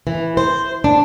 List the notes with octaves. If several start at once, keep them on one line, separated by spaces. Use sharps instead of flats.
E3
C5
D4